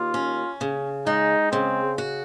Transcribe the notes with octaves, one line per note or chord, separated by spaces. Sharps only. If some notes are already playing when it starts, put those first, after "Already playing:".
Already playing: D#2 F4
C#4
C#3
G#3 D#4
C#3 C4
F#4